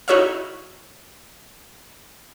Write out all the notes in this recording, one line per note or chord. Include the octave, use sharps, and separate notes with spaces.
D#4 E4 F#4 C#5 E5 F5